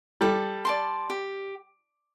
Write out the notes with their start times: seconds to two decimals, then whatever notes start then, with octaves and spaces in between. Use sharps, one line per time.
0.21 G3 A4
0.65 D5 A5 C6
1.10 G4